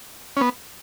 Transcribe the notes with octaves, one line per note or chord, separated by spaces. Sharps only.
C#4
B3